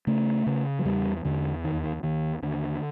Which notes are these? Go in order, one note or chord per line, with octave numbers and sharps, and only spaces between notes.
C#3 A3
C#3
F#3
E2 G3
E2 D3
D#2 D#3
D#2 D#3
D#2 D3